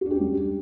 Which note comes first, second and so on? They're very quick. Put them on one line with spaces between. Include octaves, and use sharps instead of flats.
F#4 D4 G4 C#4 G3